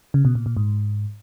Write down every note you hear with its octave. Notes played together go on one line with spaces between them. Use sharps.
C#3
B2
A#2
A#2
G#2